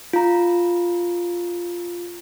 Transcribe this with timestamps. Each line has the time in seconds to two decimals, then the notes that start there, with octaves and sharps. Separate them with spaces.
0.13 F4 A#5